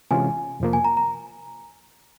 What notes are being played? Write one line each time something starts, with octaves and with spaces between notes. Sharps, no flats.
C3 E3 G#3 C#4 F4 G#5
F2 C3 F3 A#3
G#5
A#5
A#5